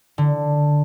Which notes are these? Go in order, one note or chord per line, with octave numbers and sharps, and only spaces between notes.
D3